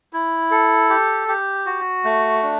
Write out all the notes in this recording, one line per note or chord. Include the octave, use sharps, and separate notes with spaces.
E4
A4
G4
G4
F#4
A3
D4